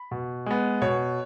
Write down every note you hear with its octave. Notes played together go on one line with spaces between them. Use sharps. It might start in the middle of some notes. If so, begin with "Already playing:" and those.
Already playing: B5
B2
G#3 B3
B2 C#5